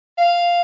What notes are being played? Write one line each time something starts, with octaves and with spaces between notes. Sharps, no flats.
F5